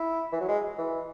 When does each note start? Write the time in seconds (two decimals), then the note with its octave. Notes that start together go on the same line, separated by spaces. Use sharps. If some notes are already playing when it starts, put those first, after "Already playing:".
Already playing: E4
0.32 E3
0.40 F#3
0.48 G#3
0.78 E3